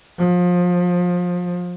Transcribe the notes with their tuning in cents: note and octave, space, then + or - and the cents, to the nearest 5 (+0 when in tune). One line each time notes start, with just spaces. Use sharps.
F3 +25